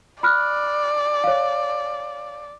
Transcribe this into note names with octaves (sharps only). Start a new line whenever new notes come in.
D5 B5 F6 F#6
C#5 F5